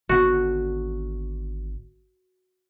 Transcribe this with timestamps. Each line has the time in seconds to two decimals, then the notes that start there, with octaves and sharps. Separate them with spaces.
0.09 G#1 D3 B3 F#4